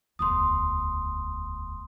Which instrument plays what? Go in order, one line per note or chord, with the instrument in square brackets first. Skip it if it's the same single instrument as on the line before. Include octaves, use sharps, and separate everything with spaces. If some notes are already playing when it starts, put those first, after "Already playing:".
[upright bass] E1 D2 [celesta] C6 D#6